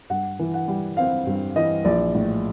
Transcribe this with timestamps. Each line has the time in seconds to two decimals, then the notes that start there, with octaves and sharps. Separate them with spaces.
0.10 G2 F#5
0.39 E3
0.54 F#5
0.68 G3
0.97 C4 F5
1.27 G2
1.56 E3 D#5
1.85 A#1 D5
2.15 A2